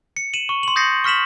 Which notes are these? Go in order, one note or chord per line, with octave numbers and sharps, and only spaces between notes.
C#7
D#7 E7 F#7
C#6
C6 F#7
D#6 G6 A6 A#6 C7 C#7
C#6 F6 B6 E7 F#7